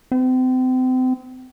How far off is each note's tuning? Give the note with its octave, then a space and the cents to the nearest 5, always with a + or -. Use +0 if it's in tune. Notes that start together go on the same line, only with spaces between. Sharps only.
C4 -35